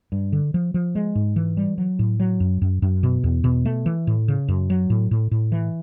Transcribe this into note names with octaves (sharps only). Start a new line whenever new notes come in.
G2
D3
F3
F3
G#3
G#2
E3
G3
F#3
A2
F#3
F#2
F#2
F#2
B2
E2
B2
A3
E3
A2
C#3
F#2
F#3
A2
A2
A2
E3